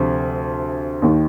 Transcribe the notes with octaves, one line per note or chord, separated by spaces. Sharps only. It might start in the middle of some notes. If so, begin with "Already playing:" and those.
Already playing: D2 C3 F3
D#2 D#3